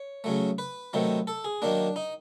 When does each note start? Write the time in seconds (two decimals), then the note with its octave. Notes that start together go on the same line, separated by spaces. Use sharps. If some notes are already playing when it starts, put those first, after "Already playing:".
Already playing: C#5
0.24 C#3 F#3 A3
0.58 B4
0.93 C3 D#3 F#3 A3
1.27 A4
1.45 G#4
1.62 D#3 F#3 A#3 D4
1.96 D#4